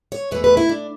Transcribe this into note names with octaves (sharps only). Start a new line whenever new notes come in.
C#5
E2 B2 A3 B4
B4
E4
D4